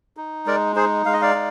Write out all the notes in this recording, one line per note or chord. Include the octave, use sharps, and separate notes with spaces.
D#4
G#3 A#4 D5
D#4 G#4 C5
G#3 F5
D#5
D5 F5
D#4